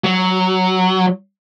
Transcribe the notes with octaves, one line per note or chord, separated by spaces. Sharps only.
F#3